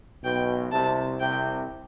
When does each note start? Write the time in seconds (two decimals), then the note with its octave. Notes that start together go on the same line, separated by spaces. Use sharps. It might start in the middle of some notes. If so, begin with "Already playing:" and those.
0.24 B1 B2 G5
0.72 C2 C3 A5
1.20 C2 C3 G5